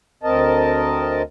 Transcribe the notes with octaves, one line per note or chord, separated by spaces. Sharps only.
D2 C4 A#4 D#5 A5